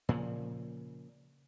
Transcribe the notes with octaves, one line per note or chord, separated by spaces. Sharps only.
A#2 C#3 F3